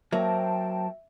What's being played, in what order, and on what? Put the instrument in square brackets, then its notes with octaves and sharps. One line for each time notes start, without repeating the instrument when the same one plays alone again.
[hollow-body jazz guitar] F#3 A#3 [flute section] C5 G5 A5 [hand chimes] E5